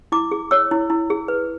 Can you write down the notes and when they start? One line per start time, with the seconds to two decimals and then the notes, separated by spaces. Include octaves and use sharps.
0.12 E4 D6
0.31 G#4
0.51 C#5 E6
0.71 E4
0.90 E4
1.10 G#4
1.28 B4